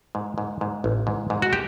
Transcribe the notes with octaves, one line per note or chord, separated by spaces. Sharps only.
G#2
G#2
G#2
A1
G#2
G#2
F#4
G4